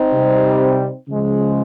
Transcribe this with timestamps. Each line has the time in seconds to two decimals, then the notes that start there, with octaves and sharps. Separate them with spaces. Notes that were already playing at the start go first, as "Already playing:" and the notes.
Already playing: C4 D#4
0.13 C3 G3
1.08 C#3 F3 G#3